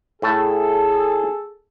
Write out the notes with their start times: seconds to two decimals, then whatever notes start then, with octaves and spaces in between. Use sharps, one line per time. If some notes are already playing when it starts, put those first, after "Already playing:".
0.22 A2 A3 G#4 A4 A5